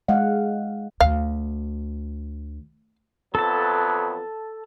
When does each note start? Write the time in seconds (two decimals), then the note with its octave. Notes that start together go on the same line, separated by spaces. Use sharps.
0.08 G#3 F5 F#5
1.00 D2 F5
3.35 F2 F#3 B3 A4 A5